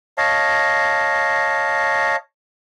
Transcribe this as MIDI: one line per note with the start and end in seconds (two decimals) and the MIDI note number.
0.18 2.16 73
0.18 2.16 75
0.18 2.16 77
0.18 2.16 81